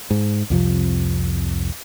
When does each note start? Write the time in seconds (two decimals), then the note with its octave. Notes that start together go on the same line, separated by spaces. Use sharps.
0.11 G#2
0.50 C2 F2 C3 F3